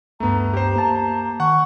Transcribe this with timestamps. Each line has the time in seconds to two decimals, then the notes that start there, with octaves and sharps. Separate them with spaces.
0.20 D2 G2 A3 B3 A#5
0.53 G4 C5
0.76 A#3 A5
1.40 D#3 F#5 C#6